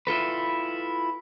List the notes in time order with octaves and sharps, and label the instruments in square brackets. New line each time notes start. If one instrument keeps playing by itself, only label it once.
[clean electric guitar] E4 F4 A4 B4